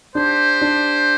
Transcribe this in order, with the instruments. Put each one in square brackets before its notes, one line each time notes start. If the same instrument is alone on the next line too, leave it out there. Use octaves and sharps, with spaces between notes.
[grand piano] D4 [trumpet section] G4 C5
[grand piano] D4